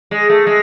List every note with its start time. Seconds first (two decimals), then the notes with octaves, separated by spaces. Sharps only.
0.11 G#3
0.29 A3
0.47 G#3